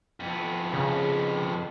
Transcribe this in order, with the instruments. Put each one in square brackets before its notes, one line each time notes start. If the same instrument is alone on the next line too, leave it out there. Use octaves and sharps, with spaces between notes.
[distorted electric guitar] F2 B3
[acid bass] C#3